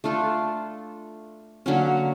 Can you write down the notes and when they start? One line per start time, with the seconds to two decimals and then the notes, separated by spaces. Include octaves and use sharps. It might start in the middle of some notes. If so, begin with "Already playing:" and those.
0.04 A3 D4 F4 A4
1.66 D3 F#3 A#3 C#4